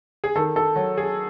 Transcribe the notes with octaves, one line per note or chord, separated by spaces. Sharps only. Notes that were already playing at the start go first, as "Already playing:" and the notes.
G#4
D#3 A4
A4
F#3
G#4